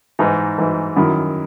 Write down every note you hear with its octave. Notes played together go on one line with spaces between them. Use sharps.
G#2 E3 D#4
G#2 E3
F#2 D#3 F#3 E4